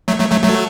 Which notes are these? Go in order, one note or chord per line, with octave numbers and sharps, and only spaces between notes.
F#3 A3
F#3 A3
F#3 A3
F#3 A3